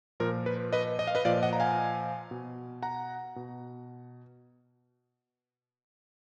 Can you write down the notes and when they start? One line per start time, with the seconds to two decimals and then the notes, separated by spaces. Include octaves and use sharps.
0.20 A#2 F3 A#4
0.46 B4
0.73 B4 D#5
0.99 D#5
1.07 F5
1.15 B4 D#5
1.25 A#2 F3 D5 F5
1.43 D#5 F#5
1.53 A#5
1.60 F5 G#5
2.31 B2
2.82 F#5 A#5
3.36 B2